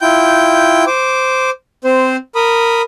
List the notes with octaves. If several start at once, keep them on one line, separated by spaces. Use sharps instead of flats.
E4 F4 G5 G6
C5 D6
C4 C5
A#4 B5 D#6